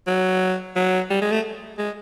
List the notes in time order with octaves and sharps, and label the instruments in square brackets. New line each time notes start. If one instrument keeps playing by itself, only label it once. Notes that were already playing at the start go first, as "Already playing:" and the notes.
[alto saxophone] F#3
F#3
G3
G#3
A3
G#3